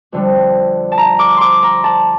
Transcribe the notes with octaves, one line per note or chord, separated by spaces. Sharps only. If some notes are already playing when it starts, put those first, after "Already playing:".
F2 D3 G3
A5
A#5
D6
C6 D6
A#5
A5